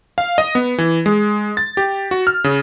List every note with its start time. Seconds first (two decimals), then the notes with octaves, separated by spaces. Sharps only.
0.18 F5
0.38 D#5
0.55 B3
0.78 E3
1.06 G#3
1.57 A6
1.77 G4
2.11 F#4
2.27 F6
2.44 C#3